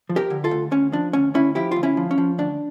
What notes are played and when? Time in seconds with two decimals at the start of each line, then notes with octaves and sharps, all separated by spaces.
0.09 F3
0.16 G4 A#4
0.30 D3
0.44 F4 A4
0.51 D2
0.71 D2 C#4
0.92 F3 D4
1.13 D2 C#4
1.34 D2 C#4 E4
1.55 F3 E4 G4
1.71 D2 F4
1.83 C#4 E4
1.97 F3
2.11 C#4
2.18 F3
2.38 D2 D4